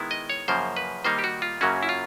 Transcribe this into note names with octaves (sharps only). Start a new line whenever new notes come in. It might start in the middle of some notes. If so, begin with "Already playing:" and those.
Already playing: D#3 G#3 B3 E4
D#5
C#5
F#2 C#3 F3 A#3 C5
B4
D#3 G3 A#3 D#4 C5
G4
F#4
F4
F#2 C#3 F#3 A#3 C#4 F#4
E4
F4